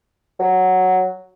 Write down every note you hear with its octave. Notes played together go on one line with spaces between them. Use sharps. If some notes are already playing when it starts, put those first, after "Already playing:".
F#3